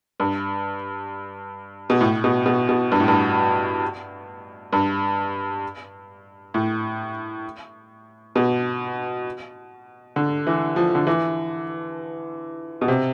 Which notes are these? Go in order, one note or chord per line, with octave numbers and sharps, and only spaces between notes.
G2
B2
A2
B2
B2
B2
G2
A2
G2
G2
A2
B2
D3
E3
F3
D3
E3
B2
C3